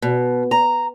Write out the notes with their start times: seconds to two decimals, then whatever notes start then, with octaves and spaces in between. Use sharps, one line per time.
0.02 B2
0.51 A#5